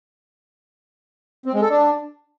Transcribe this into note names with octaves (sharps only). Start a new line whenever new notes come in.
C4
G#3
A4
D4